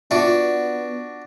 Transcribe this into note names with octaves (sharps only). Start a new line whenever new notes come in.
B3 D4 F4 F#4 D5 E5